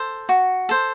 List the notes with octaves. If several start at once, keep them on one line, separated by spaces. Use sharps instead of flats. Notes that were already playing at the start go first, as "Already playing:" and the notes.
Already playing: A4 C5
F#4
A4 C5